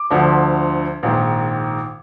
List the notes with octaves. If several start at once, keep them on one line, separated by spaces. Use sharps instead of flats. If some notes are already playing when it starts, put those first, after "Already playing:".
Already playing: D6
D2 D3 F3
A#1 G#2 D#3